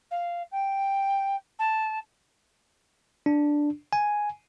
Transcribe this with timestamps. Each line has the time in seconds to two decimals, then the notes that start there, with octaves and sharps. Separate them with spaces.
0.11 F5
0.52 G5
1.59 A5
3.26 D4
3.93 G#5